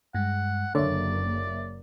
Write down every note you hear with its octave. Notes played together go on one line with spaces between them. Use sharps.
G2 G#3 F#5
F#1 D3 A#3 C#5 D5 E5